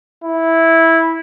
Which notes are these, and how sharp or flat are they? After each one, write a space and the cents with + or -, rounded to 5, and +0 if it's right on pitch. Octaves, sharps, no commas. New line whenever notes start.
E4 -10